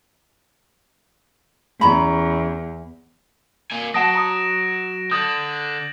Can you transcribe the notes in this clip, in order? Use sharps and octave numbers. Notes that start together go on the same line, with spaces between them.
E2 C#4 A#5 B5
A#3 G#5
F#3 F#5 A5 D#6 A#6 D7 E7
A#5 D#6
D3 D#6 G6 A6 F#7